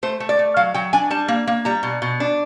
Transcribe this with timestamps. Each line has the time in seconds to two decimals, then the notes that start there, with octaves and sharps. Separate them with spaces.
0.03 A3 C5
0.20 A3
0.29 D5
0.39 A3
0.57 F#3 F5
0.74 F#3 G5
0.93 D4 G#5
1.10 G3 A5
1.28 A#3
1.47 A#3
1.65 G3 A#5
1.83 B2
2.02 B2
2.20 D4